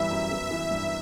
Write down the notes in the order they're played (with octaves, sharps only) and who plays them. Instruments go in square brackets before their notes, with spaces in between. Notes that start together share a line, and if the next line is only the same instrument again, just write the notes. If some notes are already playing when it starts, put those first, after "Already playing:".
Already playing: [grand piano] G1 F#2 E3 G3 [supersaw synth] E5
[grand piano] F#2
B3
E3
G2